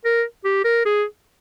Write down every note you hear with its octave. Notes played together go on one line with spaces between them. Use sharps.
A#4
G4
A#4
G#4